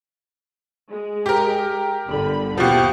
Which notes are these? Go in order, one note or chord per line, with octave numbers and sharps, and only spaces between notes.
G#3
G4 A#4
G1 D3 B5
D#2 B2 F3 G4 F5 F#5